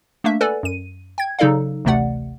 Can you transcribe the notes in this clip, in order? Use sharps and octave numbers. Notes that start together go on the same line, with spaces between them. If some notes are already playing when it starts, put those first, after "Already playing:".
A3 A#3 D4 E5
A4 B4 D5 F#5 G#5
F#2 D#7
G5 G#6
C#3 F#3 D#4 A4 D5 F5
A1 D2 C3 A3 D5 F#5